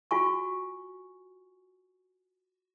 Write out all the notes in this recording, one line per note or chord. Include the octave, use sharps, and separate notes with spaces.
F4 F#4 G#5 C#6